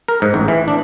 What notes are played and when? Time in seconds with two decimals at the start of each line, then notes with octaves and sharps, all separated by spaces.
0.08 A#4
0.22 G#2
0.34 A1
0.48 E3
0.68 D4